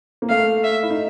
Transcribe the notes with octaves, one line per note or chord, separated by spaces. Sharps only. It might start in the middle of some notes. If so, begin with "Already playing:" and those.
A#3
A3 F5
E5
E4
D#4